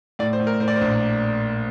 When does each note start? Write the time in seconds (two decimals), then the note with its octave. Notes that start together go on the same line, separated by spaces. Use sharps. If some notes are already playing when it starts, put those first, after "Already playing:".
0.19 A2 D5
0.33 C5
0.40 A2
0.47 A#4
0.60 A2 C5
0.68 D5
0.76 C5
0.81 A#1